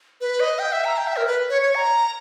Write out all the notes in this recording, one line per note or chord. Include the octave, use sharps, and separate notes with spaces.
B4
D#5
G5
E5
A#5
G5
E5
A#4
B4
C#5
C#5
A#5